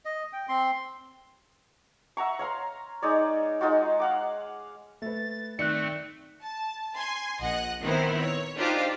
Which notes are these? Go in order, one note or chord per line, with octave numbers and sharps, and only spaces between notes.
D#5
G5
C4 C6
E5 F#5 A#5 C#6
C#5 F5 A#5 C6
G#3 D#4 C#5 D5
G#3 D#4 F4 F#4
F5 F#5 D6
A3 B4 A6
D#3 A3 C4 D5 F#6 C#7
A5
G#5 C6 G#6
A#1 D#5 F#5 F#6
D#3 B3 C4 E4 A#4 C5
C#5
D4 D#4 F4 G4 C5